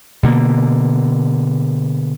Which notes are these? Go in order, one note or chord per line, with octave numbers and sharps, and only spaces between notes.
B2 D3 A#3